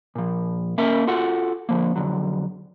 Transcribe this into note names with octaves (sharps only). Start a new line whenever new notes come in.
A#2 F3
A#3 C#4 A#4 E5
F4 F#4 A4 F#5
D3 F3 A#3
F2 D3 F#3